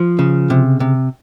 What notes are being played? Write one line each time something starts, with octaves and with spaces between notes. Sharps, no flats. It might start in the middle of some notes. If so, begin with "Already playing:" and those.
Already playing: F3
C#3
C3
C3